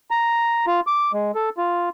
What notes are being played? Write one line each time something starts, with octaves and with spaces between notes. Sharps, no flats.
A#5
F4
D6
G#3
A4
F4